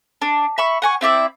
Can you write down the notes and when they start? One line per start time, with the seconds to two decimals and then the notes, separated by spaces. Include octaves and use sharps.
0.22 D4
0.58 E5 B5 C#6
0.82 F#5 G#5 C#6
1.01 C4 E4 D5 E5